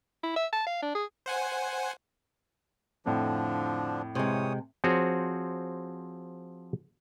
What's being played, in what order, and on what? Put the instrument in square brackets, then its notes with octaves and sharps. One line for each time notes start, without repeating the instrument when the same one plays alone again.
[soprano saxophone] E4
E5
A5
F5
D4
G#4
[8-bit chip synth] C5 F#5 G#5
[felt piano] F2 A2 [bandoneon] D3 F3 D4
[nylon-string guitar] C3 G#3 [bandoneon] E3 C#5 D#6
[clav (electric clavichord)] F3 C4 F#4 G#4 C#5